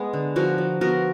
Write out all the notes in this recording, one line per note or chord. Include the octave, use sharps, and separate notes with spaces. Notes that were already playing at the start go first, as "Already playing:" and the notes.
Already playing: G#3 B3
D3
F3 F#4 A#4
F3
B3 F#4 A#4